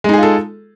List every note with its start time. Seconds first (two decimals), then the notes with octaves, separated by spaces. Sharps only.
0.04 G#3
0.09 D#4
0.13 G#4
0.18 F4
0.23 A4